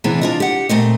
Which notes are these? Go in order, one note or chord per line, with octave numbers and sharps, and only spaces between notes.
C3 E3 B3 D4 G#4
D4 F4 D#5
G4 F#5
A#2 A3 C4 D#5